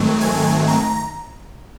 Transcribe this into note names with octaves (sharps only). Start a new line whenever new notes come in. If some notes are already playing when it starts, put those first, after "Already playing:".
Already playing: G#2 D#3 F#3 A3 C4
G#5
A#5